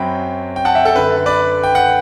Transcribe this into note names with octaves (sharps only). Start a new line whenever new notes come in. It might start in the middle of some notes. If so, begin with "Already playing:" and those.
Already playing: F#2 F#3 C4 G5 B5
G5
F#5 A5
E5 G5
A4
F#2 D3 A3 B4
B4 D5
G5
F#5